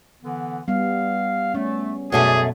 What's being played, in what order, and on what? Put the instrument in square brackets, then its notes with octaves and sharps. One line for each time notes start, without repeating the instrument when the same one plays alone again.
[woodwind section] D3 E3 B3
[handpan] G3 B3 [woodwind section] F5
[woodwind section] A3 [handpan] C#4
[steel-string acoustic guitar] F#2 B2 A3 [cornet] G#4 [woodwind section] A4 D5